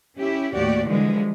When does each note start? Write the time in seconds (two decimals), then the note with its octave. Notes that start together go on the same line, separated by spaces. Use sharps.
0.18 C#4 E4 G4
0.53 D#2 A2 F#4 G4 D5
0.88 D3 E3 F3 G3 G#3